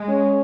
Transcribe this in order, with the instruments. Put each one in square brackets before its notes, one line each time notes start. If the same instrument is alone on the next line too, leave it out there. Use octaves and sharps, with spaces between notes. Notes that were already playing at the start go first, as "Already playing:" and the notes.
Already playing: [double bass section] G#3
[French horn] C#4